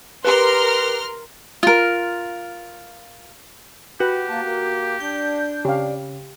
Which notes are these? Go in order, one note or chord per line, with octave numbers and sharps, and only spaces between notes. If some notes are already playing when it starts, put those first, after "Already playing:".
G4 A#4 B4 C6 F6
F4 A#4
F#4 G4 B4 G5
A#3 A5
A#3
D4 G6
C#3 G4 F5